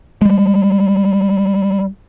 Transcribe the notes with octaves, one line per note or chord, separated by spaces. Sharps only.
G3 G#3